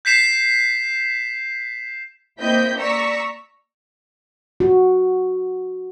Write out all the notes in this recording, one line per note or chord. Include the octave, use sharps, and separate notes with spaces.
G6 B6 C7 E7
A#3 C4 E4 D#5 G6 B6
D5 A#5 C#6 E6 B6
F#4